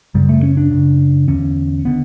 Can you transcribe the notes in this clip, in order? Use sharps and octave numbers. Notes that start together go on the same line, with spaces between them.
F#2 C#3 G3
A3
C#4
D4
F#2 C#3
E2 D3 C#4
D3 B3